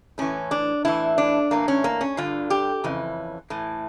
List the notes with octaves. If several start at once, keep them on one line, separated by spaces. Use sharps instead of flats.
A2 E3 C#4
D4
A2 E3 E4
D4
A2 E3 A#3
C#4
A#3
C#4
G2 D3 F4
G4
F2 C#3 E3
A2 E3